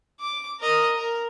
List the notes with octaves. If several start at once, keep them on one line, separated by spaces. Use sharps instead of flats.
D6
A#4 D#5
A#4